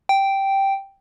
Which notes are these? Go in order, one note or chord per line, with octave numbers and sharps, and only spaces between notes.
G5